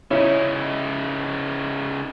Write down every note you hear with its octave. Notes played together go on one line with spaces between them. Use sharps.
C#3 C#4 D#4 E4